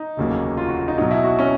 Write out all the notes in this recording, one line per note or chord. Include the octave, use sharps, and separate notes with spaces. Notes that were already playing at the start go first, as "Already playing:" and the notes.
Already playing: D#4
F1 D#2 C#3 F#3 A#3
F4
F#4
F4
D#4
B1 B2 F#3 D#4
E4
F#4
C#4